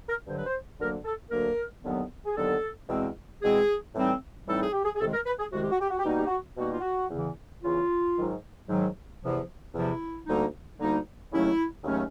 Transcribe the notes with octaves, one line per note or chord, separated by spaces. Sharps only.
A#4
G2 D3 F#3 C5
B4
C5
D2 D3 F#3 A#3 A#4
A4
D2 D3 F#3 A#3 A#4
D#2 D3 F#3 B3
G#4
D#2 D3 F#3 B3 A4
E2 B2 G#3 C4
E2 B2 G#3 C4 G#4
A2 E3 G3 C4 D#4
A2 E3 G3 C4 D#4 A4
G#4
G4
G#4
G#4
C2 C3 D#3 G#3 A4
A#4
B4
G#4
C2 C3 D#3 G#3 F#4
G4
F#4
G4
F#4
G4
B2 G3 A#3 D#4 F#4
G4
F#4
B2 G3 A#3 D#4 F#4
F4
F#4
E2 C#3 E3
E2 C#3 E3 F4
G#2 D#3 F#3
G#2 D#3 F#3
E2 C3 F3
E2 C3 F3 E4
D2 D3 G3 A#3 D#4
D2 D3 G3 A#3 D#4
D#2 C#3 F#3 A3 C#4 E4
D#2 C#3 F#3 A3 C#4